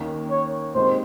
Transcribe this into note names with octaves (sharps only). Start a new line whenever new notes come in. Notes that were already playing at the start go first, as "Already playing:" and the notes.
Already playing: D#2 D#3 A#3 C#4
C#5
A#2 G#3 C4 D#4 G4 C5